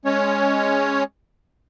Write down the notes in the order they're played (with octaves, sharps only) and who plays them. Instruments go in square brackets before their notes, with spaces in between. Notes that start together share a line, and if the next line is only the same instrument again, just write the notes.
[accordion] G#3 C#4 C#5